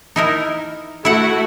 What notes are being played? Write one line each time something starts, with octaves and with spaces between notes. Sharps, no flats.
D#4 E4 A#4
A3 E4 F#4 F#5